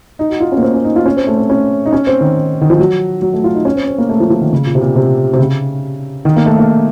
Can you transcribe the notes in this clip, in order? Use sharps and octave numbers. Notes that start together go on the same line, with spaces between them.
D#4
F#4
F4
C#4
A#3
C4
C#4
D#4
F4
C#4
C4
A3
C4
C#4
D#4
C#4
C4
D#3
D#3
F3
F#3
F#3
A3
F4
D#4
C#4
C4
C4
A#3
A3
F3
F3
D#3
C#3
A#2
C3
A#2
C3
C3
C#3
D#3
A#3
A3
A#3